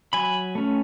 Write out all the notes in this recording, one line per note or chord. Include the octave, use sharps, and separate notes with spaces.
F#3 G#5 B5
A3 C#4